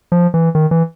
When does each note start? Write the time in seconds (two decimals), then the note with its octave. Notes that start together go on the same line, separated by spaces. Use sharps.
0.12 F3
0.34 E3
0.55 D#3
0.71 E3